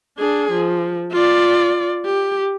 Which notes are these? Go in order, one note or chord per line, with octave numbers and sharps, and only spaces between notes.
D4 G#4
F3
F4 D5
G4